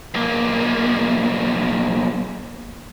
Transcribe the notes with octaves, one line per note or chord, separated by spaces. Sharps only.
B1 A#3